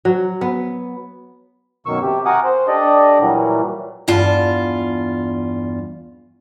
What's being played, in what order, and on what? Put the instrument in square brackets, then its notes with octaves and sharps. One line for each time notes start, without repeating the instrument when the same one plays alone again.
[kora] F#3
B3
[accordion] F#2 B2 D#3 A#3 C#6 E6
C3 G4
F#4 A#4 F#5 G#5 D6 D#6
C5
D4 G4 A4 D5 D#5
A#2 E3 F#3 G3
[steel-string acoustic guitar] E2 G2 F4 A5